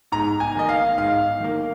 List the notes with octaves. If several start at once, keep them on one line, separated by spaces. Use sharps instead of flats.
G#2 A#5
G#5
D#3 A#3 D#5
F5
G#2 F5
D#3 A#3